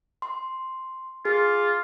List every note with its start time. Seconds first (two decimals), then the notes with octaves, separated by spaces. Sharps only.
0.22 C6
1.25 F4 G#4